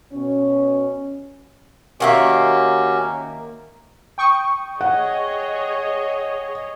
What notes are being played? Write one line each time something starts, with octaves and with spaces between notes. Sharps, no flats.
B2 C#4
D#3 A#3 C#4 F#4 G4 E5
G5 C#6 D#6
G#4 C#5 D#5 F#5